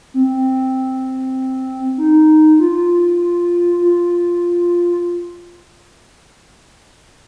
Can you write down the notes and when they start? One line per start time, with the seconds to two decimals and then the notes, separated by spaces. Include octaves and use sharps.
0.14 C4
1.97 D#4
2.60 F4
3.82 F4